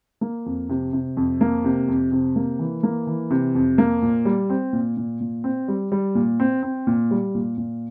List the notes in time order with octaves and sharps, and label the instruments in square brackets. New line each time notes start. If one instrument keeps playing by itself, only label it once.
[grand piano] A#3
F2
C3
C3
F2
A#3
C3
F2
C3
A#3
E3
A#3
E3
C3
F2
A#3
A#2
G3
C4
A#2
A#2
A#2
C4
G3
G3
A#2
C4
C4
A#2
G3
A#2
A#2